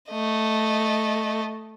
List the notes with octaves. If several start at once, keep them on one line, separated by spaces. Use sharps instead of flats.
A3 D#5